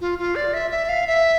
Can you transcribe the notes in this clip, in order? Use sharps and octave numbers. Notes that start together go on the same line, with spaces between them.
F4
F4
D5
E5
E5
F5
E5